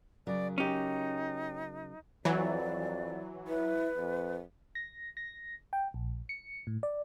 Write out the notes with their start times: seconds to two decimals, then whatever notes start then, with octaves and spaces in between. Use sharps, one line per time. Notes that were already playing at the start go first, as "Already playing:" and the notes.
0.27 C#3 F#3 A#4 D5
0.58 C#4 D#4 G4
2.25 F2 E3 F#3 D5
3.48 E4 B4
3.97 F2
4.75 A#6
5.17 A#6
5.73 G5
5.94 A#1
6.29 C#7
6.67 A2
6.83 D5